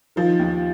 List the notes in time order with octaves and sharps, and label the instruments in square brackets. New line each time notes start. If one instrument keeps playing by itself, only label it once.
[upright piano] D#3 [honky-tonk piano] F3
[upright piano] D#2